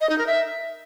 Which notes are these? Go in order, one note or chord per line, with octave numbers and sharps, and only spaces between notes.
D#5
D#4
A#4
E5